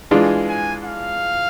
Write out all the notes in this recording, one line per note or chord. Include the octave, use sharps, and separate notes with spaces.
E3 G#3 D4 F4 G#5
G#5
F5